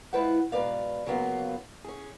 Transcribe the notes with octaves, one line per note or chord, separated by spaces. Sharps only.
G#3 E4 F4 B4 C5 F#5
G#2 B2 B4 D5 F5
C#3 F#3 A#3 B3 F4
C#4 G#4